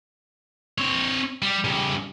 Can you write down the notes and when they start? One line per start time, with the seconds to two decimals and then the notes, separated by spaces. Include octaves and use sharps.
0.78 C4 C#5
1.42 G3
1.64 C#3 G3